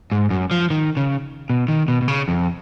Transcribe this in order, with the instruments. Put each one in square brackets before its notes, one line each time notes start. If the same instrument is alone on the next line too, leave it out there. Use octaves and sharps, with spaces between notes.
[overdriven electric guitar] G#2
F#2
F3
D#3
C#3
B2
D#3
B2
B2
C#3
F2